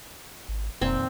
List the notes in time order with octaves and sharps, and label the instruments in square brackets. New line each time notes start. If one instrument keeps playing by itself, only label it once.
[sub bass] G#1
[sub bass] E1 [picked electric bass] F2 A#2 D#3 [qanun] C4